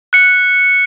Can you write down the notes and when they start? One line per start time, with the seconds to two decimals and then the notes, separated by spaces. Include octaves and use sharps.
0.13 F#6 C#7